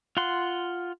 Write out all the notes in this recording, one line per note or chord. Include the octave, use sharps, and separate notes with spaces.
F4 F#5 C6